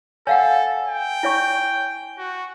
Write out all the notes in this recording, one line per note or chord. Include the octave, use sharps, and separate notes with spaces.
A4 C#5 F5 F#5 G#5
G5
E4 C#5 C#6
F#4